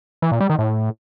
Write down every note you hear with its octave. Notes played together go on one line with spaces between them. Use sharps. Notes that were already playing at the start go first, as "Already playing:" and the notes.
E3
A#2
G3
D#3
A2